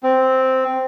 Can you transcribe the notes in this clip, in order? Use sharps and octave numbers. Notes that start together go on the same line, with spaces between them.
C4